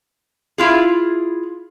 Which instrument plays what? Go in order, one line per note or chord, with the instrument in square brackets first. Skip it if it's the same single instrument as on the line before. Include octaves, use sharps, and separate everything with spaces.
[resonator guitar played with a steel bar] E4 F4 G#4